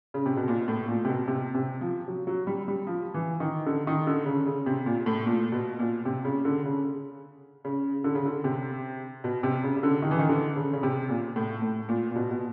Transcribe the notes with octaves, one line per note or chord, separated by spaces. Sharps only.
C#3
C3
B2
A#2
A2
A#2
C3
B2
C3
C3
F3
F#3
F#3
G3
G3
F3
E3
D#3
D3
D#3
D3
C#3
C#3
C3
A#2
A2
A#2
B2
A#2
C3
C#3
D3
C#3
C#3
D3
C#3
D3
C3
B2
C3
C#3
C#3
D3
D#3
E3
D#3
D3
C#3
C#3
C3
A#2
A2
A2
A#2
A#2
B2
B2